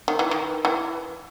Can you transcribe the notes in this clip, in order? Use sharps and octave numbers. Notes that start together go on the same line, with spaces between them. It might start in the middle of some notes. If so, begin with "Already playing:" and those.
D#3
E3
D#3
E3